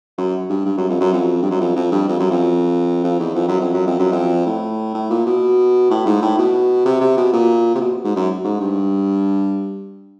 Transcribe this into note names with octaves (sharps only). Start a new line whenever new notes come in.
F#2
G2
G2
F#2
F2
F#2
F2
G2
F#2
F2
F2
G2
F2
F#2
F2
F2
E2
F2
F#2
F2
F#2
F2
F#2
F2
A2
A2
A#2
B2
A2
G#2
A2
B2
C3
C3
B2
A#2
C3
B2
G#2
F#2
G#2
G2